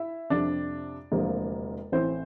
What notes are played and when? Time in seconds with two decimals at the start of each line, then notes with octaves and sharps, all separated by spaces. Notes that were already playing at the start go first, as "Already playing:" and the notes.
Already playing: E4 E5
0.30 F2 C3 G3 D4 D5
1.12 E1 D2 C3 F3 A#3
1.92 A1 A2 E3 C4 C5